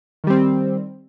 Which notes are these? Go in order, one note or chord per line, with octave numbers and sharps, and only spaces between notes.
D#3 G3 C4